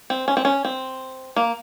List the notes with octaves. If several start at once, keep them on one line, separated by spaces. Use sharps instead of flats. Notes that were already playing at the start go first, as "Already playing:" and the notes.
C4
C#4
C4
C#4
C4
A#3